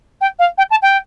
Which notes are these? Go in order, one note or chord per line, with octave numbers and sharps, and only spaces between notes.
G5
F5
G5
A5
G5